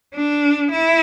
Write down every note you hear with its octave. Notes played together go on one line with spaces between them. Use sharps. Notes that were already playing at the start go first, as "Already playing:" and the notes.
D4
E4